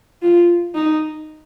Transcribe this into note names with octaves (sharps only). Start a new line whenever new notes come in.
F4
D#4